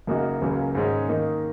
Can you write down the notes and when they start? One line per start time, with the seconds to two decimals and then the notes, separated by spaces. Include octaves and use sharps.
0.07 F#2 C#3 A#3 D#4 F#4
0.41 C#2 C#3 F#3 A#3
0.75 G#2 D#3 G#3 C#4 G#4
1.09 D#3 A#3 D#4